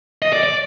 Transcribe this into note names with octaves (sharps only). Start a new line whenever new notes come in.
D#5
D5
D5